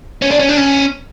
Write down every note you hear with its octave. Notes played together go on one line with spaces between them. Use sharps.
C#4
D4
C#4
D4
C#4